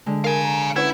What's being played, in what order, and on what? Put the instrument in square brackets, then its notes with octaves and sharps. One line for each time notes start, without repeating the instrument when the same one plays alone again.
[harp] D3 G#3
[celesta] A#4 [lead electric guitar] F5 G#5
[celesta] A#5
[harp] C#4 C#5 G5 [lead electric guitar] E4 [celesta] B4 F#5